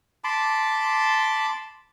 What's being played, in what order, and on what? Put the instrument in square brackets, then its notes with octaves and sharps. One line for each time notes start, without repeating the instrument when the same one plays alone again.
[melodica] A5 B5 C6 D6